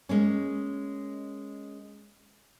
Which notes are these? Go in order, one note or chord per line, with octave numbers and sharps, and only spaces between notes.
G#3 A#3 C#4